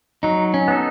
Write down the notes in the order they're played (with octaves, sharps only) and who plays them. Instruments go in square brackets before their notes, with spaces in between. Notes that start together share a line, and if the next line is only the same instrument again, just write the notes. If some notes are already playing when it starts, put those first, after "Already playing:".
[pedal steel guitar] F#3 [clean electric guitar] D#4
[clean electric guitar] C#4
[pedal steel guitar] B3 D#4 A4